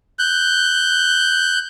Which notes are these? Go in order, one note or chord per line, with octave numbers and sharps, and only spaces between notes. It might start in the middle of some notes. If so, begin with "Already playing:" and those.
F#6 G6